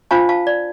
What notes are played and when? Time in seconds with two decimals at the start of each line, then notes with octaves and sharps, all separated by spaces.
0.11 D4 F4 C5 F5 A5
0.29 F5 A5
0.47 D5